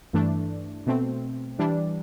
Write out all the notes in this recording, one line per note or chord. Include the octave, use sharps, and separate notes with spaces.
G2 E3 A3 D4
B2 A3 C4
E3 G3 D4